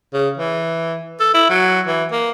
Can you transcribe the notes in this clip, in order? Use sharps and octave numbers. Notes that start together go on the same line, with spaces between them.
C#3
E3
A4
E4
F#3
E3
A#3